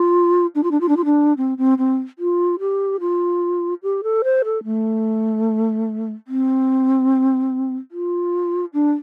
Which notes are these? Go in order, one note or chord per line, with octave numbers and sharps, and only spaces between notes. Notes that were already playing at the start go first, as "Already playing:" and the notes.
Already playing: F4
D4
F4
D4
F4
D4
F4
D4
C4
C4
C4
F4
G4
F4
G4
A4
C5
A4
A3
C4
F4
D4